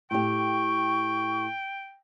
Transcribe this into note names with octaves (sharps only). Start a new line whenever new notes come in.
A2 G4 G5 C#6